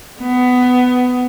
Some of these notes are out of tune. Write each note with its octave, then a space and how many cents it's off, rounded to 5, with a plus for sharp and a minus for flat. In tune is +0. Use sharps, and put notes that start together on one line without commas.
B3 +15